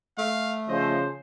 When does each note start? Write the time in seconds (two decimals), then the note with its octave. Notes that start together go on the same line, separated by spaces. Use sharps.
0.18 A3 F5
0.69 C#3 F3 C5 D#5